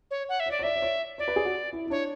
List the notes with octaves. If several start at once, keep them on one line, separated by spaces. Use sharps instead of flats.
C#5
F#5
E5
C#5
D5
C#5
D5 E5
D5
C#5
C#5 D5
B4
G#4
F#4
E4
E4
D4 C#5